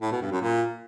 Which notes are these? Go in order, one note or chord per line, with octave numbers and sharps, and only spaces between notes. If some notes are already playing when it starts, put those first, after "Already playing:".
A2
B2
G2
F#2
A#2